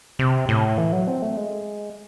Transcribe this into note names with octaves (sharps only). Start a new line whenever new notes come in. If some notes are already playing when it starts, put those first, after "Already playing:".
C3
A2
E3
F#3
C4
A3
G#3